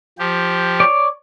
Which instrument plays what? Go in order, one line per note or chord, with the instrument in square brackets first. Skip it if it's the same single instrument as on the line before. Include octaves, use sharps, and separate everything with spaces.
[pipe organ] F3 G4
[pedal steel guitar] C#5 D5 D6